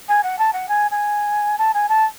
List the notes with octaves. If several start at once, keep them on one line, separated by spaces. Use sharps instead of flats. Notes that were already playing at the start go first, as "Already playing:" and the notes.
G#5
F#5
A5
F#5
G#5
G#5
A5
G#5
A5